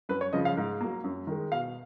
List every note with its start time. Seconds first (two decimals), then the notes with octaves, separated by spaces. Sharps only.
0.09 F#2 B4
0.21 C#5
0.33 C#3 F3 D#5
0.45 F5
0.57 G#2
0.80 F#3 A#3
1.04 F#2
1.27 D#3 G#3
1.52 B2 F5